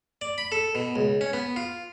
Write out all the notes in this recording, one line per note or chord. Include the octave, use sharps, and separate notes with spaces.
D5
B5
A4
B2
C#2
C#4
B3
F4